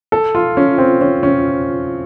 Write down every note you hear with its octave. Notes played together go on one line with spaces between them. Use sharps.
A4
F4
C#4
C4
C#4
C#4